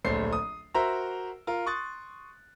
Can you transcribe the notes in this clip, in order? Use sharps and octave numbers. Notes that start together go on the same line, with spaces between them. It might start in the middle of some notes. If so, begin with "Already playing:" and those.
D1 A#1 A3 C5 C#5 C7
D#6
F#4 A#4 C5 E5 A#5 E6
F4 A#4
C6 C#6 D#6 F#6 A6